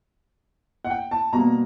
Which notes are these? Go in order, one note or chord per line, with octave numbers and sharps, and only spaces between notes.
F#5
G5
A5
B2 G3 A#3 A#5